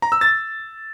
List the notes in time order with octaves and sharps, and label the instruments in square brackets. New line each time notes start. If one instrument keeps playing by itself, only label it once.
[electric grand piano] A#5
E6
A6